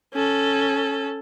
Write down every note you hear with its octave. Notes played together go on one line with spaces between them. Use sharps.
C#4 A4